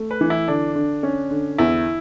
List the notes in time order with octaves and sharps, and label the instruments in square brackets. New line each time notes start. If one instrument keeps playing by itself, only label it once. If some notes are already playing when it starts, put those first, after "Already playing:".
Already playing: [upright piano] A3
[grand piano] B4
[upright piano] E3
[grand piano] E4
[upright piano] D3 [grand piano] D4
[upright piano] D3
C#4
D3
[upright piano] E2 [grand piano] E4